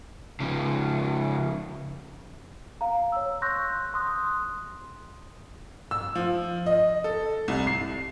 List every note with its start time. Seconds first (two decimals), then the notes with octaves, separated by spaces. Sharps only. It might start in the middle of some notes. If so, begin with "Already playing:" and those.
0.40 C#3 F3
2.81 F5 A#5
3.12 C#5 E6
3.42 C6 C#6 E6 F#6 G6 A#6
3.94 C6 D#6 F#6
5.91 E6
6.15 F3
6.66 D#5
7.04 A4
7.48 C2
7.67 C7